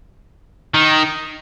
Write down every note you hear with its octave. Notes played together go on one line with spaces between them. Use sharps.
D#3